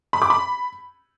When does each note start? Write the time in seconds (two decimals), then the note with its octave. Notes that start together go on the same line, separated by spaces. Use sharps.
0.13 B5
0.22 D6
0.30 B5